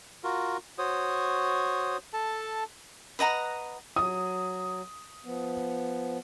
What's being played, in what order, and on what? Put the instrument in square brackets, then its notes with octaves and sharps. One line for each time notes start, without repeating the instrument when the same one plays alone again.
[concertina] F4 F#4 A#4
F#4 C5 C#5 D#6
A4 A5
[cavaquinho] B4 D#5 F#5 A#5
[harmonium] F#3 [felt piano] D#6
[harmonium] F3 B3